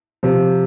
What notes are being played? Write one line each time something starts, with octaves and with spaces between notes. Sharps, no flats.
C3 F3